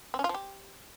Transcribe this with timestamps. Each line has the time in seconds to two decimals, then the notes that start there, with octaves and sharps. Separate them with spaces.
0.14 C4
0.19 C#4
0.24 F4
0.29 F3
0.34 G4